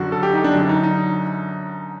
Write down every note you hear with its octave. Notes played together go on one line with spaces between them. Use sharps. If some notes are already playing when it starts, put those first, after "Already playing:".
Already playing: F#2 D3 F#3 F#4
A4
G4
D#4
D4
F#2 D3 F#3
D#4
D#4